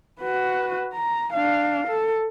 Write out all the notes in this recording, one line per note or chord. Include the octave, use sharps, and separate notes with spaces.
F#4 B4
A#5
D4 F5
A4